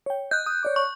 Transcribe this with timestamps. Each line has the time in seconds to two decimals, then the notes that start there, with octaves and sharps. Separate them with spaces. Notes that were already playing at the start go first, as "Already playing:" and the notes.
0.06 C#5 G5
0.31 D#5 F#6 G6
0.46 D#6
0.63 C#5 D5 D6
0.76 C#6